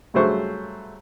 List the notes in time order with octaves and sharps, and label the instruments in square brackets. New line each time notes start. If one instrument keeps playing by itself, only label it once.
[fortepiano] G2 C#3 F#3 A3 C5 C#6